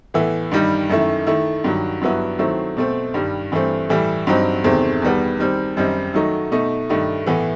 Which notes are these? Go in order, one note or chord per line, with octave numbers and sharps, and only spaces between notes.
A2 E3 B3 E4
G2 D#3 G3 D#4
F#2 D#3 A3 E4
D#3 A3 E4
G2 D#3 F#3
G2 F#3 B3 E4
D#3 F#3 A3 C4 E4
B2 A3 C4
G2 D#3 G3
G2 E3 A3 C4
A2 E3 G3
G2 F#3 C4 D#4
E2 C3 D#3 A3 C4
E2 D#3 G3 B3
D#3 G3 C4
F#2 D#3 G3 C4 D#4
D#3 F#3 A3 D#4
B2 A3 D#4
G2 D#3 A3 D#4
A2 E3 B3 E4